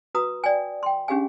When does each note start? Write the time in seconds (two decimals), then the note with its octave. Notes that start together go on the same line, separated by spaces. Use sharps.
0.15 F#4 B4 A#5 D#6
0.44 D5 G5 G#5
0.83 G5 C6
1.08 C#4 D4 G4 G#4 F5 G#5